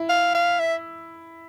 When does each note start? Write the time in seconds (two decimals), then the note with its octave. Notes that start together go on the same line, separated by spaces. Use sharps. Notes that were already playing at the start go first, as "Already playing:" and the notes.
Already playing: E4
0.10 F5
0.35 F5
0.60 E5